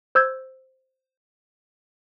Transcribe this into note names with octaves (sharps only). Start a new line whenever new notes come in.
C5 E6 G6 G#6